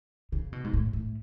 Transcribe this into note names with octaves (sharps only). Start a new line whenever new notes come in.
C#3
B2
G#2
A2
A2